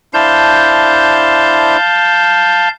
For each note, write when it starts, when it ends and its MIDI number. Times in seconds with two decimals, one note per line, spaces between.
0.14 1.77 62
0.14 1.77 64
0.14 1.77 72
0.14 2.68 77
0.14 2.68 81
0.14 2.68 91